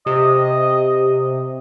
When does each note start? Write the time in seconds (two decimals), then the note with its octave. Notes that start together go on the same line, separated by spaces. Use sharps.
0.06 C3 D#5